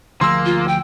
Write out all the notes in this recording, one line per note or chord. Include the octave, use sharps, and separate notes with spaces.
D2 F3 A#3 G#4 C6 E6
F4
G5